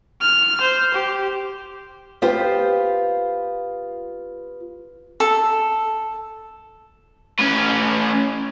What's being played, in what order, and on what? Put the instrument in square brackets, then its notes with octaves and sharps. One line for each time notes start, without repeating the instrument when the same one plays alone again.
[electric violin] F6
C5
G4
[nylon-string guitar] B3 F4 G4 C5 G5
[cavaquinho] A4
[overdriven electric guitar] A2 C#4